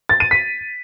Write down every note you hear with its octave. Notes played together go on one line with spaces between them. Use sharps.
A6
D#7
B6